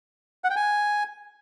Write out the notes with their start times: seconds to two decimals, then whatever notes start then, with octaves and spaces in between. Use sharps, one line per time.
0.44 F#5
0.50 G5
0.56 G#5